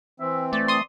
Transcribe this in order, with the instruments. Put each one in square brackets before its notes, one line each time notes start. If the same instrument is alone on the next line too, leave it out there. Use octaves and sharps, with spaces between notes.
[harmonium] E3 C4 [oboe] E5
[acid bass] A3 [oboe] D5
[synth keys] C6 D#6